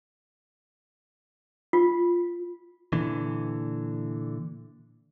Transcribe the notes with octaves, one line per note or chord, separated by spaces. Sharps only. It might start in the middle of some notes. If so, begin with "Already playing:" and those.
F4
A#2 D3 E3